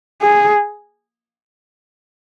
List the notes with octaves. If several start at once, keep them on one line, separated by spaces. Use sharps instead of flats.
G#4